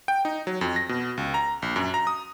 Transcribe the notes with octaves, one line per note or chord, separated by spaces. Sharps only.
G5
D#4
F#3
F2
A#6
B2
C#2
A#5
A#1
F#2
A#5
D#6